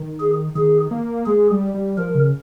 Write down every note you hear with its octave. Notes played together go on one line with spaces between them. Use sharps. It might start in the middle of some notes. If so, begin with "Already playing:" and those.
Already playing: D#3
G#4
D#3 G#4
A#3
G#3 G#4
G3
G3
F3 A#4
C#3